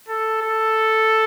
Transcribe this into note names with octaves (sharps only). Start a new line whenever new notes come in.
A4
A4